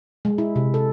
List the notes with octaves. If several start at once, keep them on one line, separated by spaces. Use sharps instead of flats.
G#3
E4
C3
A4